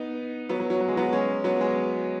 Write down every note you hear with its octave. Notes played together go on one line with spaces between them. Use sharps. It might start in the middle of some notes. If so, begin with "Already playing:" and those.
Already playing: B3 D#4
F#3 B3
F#3
F#3
F#3
G#3
F#3 B3
G#3 C#4
F#3 B3
G#3 C#4